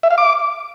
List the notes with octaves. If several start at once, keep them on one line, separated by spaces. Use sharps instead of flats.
E5
F5
D6